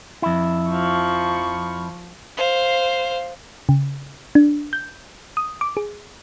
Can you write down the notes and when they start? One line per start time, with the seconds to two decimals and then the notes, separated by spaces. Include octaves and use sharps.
0.22 F2 E4
0.70 F3 C#6
2.37 C5 F5
3.69 C#3
4.35 D4
4.73 G6
5.37 D#6
5.61 D6
5.77 G#4